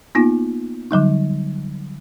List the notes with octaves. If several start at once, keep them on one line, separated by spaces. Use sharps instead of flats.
A#3 B3 D#4 F4
D3 F#3 G3 D#4